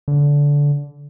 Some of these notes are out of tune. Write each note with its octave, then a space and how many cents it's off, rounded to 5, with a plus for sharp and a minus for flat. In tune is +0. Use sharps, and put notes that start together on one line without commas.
D3 -20